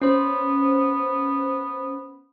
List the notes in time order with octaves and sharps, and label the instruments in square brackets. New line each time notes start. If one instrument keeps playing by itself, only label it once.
[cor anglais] B3 [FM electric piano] C#4 C5